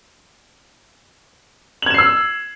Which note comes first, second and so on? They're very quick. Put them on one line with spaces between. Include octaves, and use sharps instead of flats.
F#7 G#6 E7 C7 E6